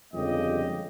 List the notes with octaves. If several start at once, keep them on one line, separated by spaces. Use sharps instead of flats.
G1 F2 C#3 G#3 G4 D#5